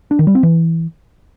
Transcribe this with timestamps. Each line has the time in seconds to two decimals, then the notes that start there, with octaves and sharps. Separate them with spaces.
0.11 D4
0.19 D#3
0.27 G3
0.35 C4
0.43 E3